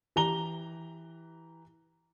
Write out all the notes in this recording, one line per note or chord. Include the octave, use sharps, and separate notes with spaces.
E3 G4 A#5 G7